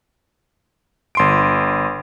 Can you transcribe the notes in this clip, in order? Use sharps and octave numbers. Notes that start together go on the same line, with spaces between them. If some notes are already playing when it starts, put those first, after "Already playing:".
G1 C6 D7